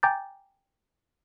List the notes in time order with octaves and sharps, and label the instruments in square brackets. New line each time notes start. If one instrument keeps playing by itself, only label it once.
[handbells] G5 G#5 A#5 D6 G6 A6